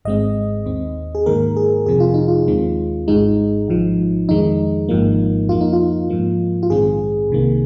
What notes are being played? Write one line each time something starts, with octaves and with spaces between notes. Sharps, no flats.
G#1 G#2 G#3 C4 D#5
D#2 D#3 C4
G#4
G#2 D#3 A#3 A#4
G#4
F2 C3 F3 C4 G#4
F4
D#4
F4
D#2 D#3 G#3 C4
G#1 G#2 G#3 D#4
G#1 G#2 F3
F2 D#3 G#3 D#4
G#1 G#2 F3 A#3
F2 F3 A#3 F4
D#4
F4
G#2 F3 A#3
F4
A#1 G#2 D#3 G#3 C4 G#4
C2 C3 D#3 A#3